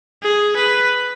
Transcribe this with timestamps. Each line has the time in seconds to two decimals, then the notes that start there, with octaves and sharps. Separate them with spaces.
0.23 G#4
0.56 B4